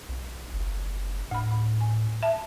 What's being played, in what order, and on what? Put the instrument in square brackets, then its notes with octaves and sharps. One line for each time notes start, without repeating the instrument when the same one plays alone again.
[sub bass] B1
F#1
[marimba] D2 B5 [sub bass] A2
[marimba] G#5
E5 A5